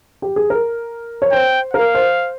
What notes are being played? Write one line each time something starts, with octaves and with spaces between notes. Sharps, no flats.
G4
G#4
A#4
C#5
C5 G5
A#4 F5
C5